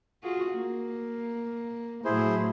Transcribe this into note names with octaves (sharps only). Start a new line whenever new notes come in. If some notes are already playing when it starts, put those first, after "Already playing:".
F4 F#4 G#4
A#3
A2 F#3 E4 G#4 C5